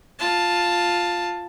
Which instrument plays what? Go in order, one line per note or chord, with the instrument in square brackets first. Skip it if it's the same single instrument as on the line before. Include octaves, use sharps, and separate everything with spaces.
[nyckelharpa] F4 A5